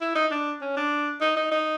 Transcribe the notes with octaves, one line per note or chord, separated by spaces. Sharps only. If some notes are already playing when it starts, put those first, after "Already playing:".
E4
D#4
D4
C#4
D4
D#4
D#4
D#4